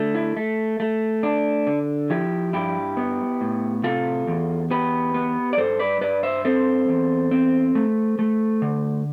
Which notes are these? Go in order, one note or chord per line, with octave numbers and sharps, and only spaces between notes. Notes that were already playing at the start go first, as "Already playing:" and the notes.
Already playing: D3 A3
E4
A3
A3
D4
D3
F3 E4 G4
G2 E4 G4
B3
A2
C3 F4 A4
E2
B3 G4 B4
B3
D5
G2 A4 C5
B4 D5
G2 B4 D5
C5 E5
C4 A4 C5
E2
C4
A3
A3
D3